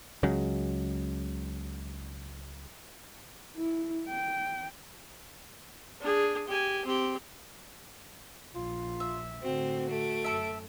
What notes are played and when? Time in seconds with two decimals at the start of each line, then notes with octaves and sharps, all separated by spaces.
0.23 C#2 C#3 F#3 G#3
3.56 E4
4.08 G5
6.01 D4 G#4
6.48 G4 G#5
6.85 C4 G4
8.55 A#1 F4
9.00 E5
9.43 A2 D3 C4 F#4
9.90 A3 D7
10.24 F#2 A4 E5